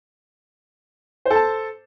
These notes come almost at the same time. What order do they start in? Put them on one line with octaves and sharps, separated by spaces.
C5 A4 A5